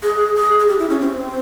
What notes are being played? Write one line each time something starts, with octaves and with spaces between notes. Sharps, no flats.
G#4
G#4
G#4
G4
E4
C#4
C4